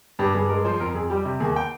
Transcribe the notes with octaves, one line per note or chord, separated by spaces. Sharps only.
G2 G4
G2 G#4
G#3 A#4
F3 C5
F2 A#4
F2 G#4
G3 G4
C3
D#2 G#4
G5